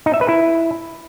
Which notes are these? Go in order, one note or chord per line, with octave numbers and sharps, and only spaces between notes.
D#4
E5
B4
E4